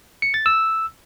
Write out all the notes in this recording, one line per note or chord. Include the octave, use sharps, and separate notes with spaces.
C#7
A6
E6